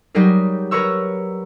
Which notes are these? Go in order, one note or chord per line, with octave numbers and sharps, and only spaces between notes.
F#3 G3 D#4 G4 G#4 A#4
A#4 B4 C#5 A#5 C#6 E6